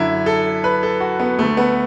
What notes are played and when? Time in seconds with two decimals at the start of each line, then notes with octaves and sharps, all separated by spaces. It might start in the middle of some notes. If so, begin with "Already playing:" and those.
Already playing: F#2 D3 E4
0.26 A4
0.64 B4
0.83 A4
1.00 F#4
1.19 B3
1.39 D2 D3 A3
1.57 B3